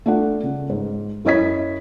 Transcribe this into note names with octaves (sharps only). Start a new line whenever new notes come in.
A3 D4 F4 F#5
C#3
G#2
F#2 E4 C#5 D#5 G#6 B6